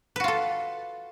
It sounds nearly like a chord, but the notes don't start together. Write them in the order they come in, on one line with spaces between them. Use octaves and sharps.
B4 F#4 F4 A4